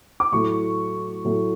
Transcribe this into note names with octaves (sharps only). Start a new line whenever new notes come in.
D6
A2 F#3 A3 C#6
A2 F#3 A3